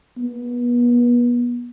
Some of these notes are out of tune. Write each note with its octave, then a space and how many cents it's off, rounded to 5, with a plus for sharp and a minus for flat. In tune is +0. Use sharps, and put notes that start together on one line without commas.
B3 -30